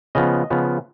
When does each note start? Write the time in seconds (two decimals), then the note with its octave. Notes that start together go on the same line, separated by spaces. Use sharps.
0.15 C#3 F3 B3 D#5
0.50 C#3 F3 B3